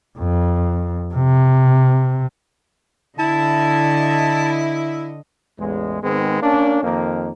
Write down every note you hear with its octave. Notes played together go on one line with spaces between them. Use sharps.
F2
C3
D3 E4 D#5 A5
A1 E2 G#3
G#2 D#3 G#3 B3 C4
A#3 C#4 D4
F2 D#3 A#3